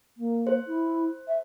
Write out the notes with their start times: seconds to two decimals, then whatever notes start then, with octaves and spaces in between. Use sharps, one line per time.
0.17 A#3
0.47 C5
0.67 E4
1.27 E5